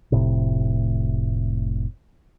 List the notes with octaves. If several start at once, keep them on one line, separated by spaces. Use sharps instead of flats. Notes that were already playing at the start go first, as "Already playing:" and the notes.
F1 A2 C3